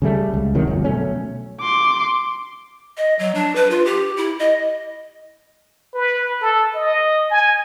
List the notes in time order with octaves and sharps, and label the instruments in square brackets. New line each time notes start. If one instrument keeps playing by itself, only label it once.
[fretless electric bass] C#3 G3 A3
C#2
C3 D#3 F#3
G1 F2
B2 F#3 A3 C#4
[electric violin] C6 D6
[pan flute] D#5
F#3
D4
B4
F4
G4
E4
D#5
[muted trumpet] B4
A4
D#5
G#5